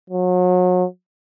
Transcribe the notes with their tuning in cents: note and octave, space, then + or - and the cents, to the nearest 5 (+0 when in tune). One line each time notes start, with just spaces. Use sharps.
F#3 -35